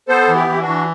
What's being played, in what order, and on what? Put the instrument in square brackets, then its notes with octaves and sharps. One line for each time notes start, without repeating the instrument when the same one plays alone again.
[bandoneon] B3 [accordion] A4 C5
[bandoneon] E3
[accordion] E4 G4
[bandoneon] E3 [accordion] E4
[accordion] D4 F#4
[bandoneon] E3